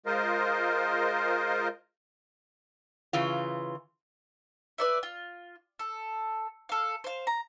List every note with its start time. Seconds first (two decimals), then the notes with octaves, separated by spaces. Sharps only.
0.06 G#3 F4 A#4 C5 D#5
3.13 C#3 E3 F4
4.78 B4 D5 E5
5.03 F4
5.79 A4
6.69 A4 F5
7.04 C5 F5
7.27 A#5